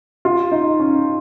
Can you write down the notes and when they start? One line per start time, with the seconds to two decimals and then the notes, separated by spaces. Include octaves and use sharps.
0.25 F4
0.51 D#4
0.80 C#4